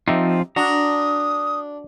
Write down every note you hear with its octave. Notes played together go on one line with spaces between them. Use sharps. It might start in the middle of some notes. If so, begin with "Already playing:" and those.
F3 C4 D#4 F4 G4 E5
D4 F#4 A#5 D#6